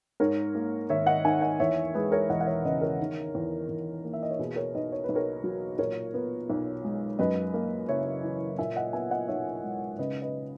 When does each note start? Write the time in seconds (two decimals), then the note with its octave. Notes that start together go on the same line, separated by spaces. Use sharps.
0.20 G#2 A#4 C#5
0.55 A#3
0.89 G#1 C#5 E5
1.07 D#5 F#5
1.24 D#3 E5 G#5
1.42 D#5 F#5
1.60 E2 C#5 E5
1.94 G#3 G#4 B4
2.12 A#4 C#5
2.29 E1 D#5 F#5
2.40 F#5
2.46 C#5 E5
2.65 C#3 B4 D#5
2.81 A#4 C#5
3.00 D#3
3.35 E2
3.69 E2
4.04 A#3
4.13 E5
4.23 D#5
4.30 C#5
4.39 B2 G#4 B4
4.56 A#4 C#5
4.74 B1 B4 D#5
4.92 C#5
5.04 B4
5.09 B1
5.15 A#4 C#5
5.44 F#3
5.79 A#2 A#4 C#5
6.14 B3
6.50 B1
6.85 G#3
7.19 F#2 B4 D#5
7.54 A#3
7.89 F#1 C#5 E5
8.24 E3
8.58 A#2 E5 G#5
8.76 D#5 F#5
8.93 B3 E5 G#5
9.11 D#5 F#5
9.28 B1 C#5 E5
9.64 G#3
9.99 C#3 B4 D#5
10.22 B4 D#5